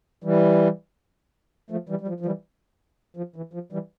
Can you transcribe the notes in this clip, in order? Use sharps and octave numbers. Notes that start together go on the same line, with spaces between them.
E3 G3
F3 A3
E3 G3
G3
F3
F3
E3 G3
F3
E3
F3
E3 G3